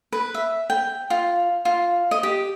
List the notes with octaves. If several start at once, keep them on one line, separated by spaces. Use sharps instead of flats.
B4
E5
G5
F4
F4
D#5
G4